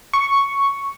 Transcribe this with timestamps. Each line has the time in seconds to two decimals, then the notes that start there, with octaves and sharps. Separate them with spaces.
0.13 C#6